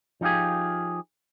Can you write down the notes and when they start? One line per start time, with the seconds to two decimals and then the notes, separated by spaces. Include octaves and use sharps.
0.21 F3 D#4 F4 G4 G#4